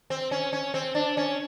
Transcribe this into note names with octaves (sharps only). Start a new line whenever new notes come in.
C4
C#4
C#4
C4
D4
C#4